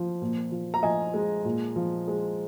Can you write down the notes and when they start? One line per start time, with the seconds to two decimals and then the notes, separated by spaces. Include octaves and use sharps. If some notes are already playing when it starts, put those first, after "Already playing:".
Already playing: F3
0.22 A#2
0.52 F3
0.74 A#5
0.83 F3 D#5 G#5
1.14 G#3
1.45 A#2
1.76 F3
2.08 G#3